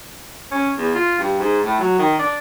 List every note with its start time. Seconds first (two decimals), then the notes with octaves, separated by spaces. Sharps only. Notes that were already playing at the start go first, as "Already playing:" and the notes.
0.51 C#4
0.77 E2
0.94 F4
1.19 G2
1.39 G#2
1.64 A2
1.80 F#3
1.99 D#3
2.19 D4